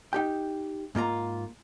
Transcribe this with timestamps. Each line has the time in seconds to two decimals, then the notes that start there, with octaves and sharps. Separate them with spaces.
0.13 D#4 G4 G5
0.95 G#2 A#3 F4 A#5